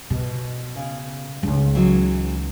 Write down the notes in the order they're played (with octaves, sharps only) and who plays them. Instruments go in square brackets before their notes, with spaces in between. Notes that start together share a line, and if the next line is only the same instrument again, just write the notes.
[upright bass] B2
[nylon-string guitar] C#3
[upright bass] C#2 D#4
[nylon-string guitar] E3 F#3 G#3